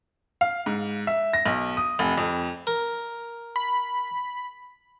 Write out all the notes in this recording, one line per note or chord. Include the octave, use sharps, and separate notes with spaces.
F5
G#2
E5
A#6
B1
D#6
F1
F2
A#4
B5